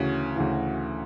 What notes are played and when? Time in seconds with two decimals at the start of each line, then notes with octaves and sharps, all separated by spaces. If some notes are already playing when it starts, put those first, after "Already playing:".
Already playing: D2 C#3 E3 F#4
0.36 D2 C#3 E3